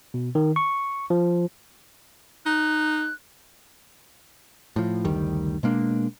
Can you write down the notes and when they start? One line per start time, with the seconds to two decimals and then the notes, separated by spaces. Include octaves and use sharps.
0.14 B2
0.35 D#3
0.56 C#6
1.10 F3
2.46 D#4 F#6
4.76 A2 F3
5.04 F#1 D2 D#3 G3
5.63 B2 G#3 A#3 D4